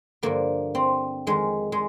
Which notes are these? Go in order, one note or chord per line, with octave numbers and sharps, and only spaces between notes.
G2 D3 F3 A#3
C4
F2 D#3 G#3
G#3